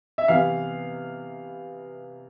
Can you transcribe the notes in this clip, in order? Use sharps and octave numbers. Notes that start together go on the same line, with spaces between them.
E5
C3 E3 B3 F5